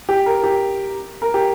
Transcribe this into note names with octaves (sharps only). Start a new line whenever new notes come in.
G4
A#4
G4
A#4
G4